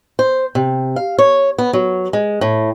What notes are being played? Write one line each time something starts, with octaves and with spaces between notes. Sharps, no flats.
C5
C3
F5
C#5
B3
F#3
G#3
A2